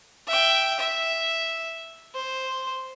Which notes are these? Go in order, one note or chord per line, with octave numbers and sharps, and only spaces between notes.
E5 G5
E5
C5